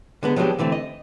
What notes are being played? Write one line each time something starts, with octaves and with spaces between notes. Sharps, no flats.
D3 G#3 B3
F3 F#3 G#3 B3 D4 G4
D3 E3 A3 C4
D#5